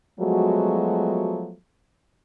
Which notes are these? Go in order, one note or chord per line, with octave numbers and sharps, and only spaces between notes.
F3 F#3 G#3 A3 B3 F#4